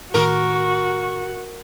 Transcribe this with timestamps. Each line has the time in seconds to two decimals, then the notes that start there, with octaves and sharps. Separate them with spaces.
0.14 A2 D#3 F#4 A#4 C#6